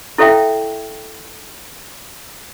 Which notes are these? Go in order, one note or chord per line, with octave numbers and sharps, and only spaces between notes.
E4 A4 C#5 E5 F5 G5